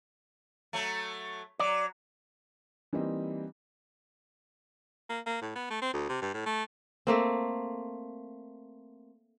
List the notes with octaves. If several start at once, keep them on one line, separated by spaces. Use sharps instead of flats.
F#3 A3
F#3 D5
E3 G3 A#3 C4 D#4
A#3
A#3
A2
B3
A3
C4
D2
C3
G2
A2
A3
A3 A#3 C4